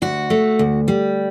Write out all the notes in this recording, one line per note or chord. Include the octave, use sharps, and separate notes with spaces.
D2 F#4
A3
D2
G3